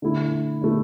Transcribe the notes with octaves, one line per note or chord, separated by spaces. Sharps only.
D3 A3 E4
D3 A3 E4